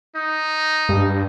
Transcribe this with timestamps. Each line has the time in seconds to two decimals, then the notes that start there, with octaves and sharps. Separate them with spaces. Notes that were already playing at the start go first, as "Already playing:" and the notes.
0.16 D#4
0.89 G2